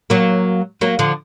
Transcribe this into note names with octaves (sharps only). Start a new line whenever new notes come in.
F#3 A#3
F#3 A#3
D3 F3